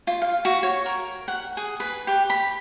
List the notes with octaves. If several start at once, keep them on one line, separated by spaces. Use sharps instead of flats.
F4
F5
F#4
C#5
A#4
F#5
G#4
B4
G4
B5